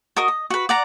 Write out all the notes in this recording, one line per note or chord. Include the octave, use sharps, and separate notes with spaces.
F#4 A#4 D#5 D#6
D#5
F#4 B4
D5 F#5 A#5